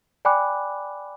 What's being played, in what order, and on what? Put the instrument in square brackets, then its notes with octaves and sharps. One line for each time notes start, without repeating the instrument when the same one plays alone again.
[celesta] D5 G5 G#5 B5 D6 F#6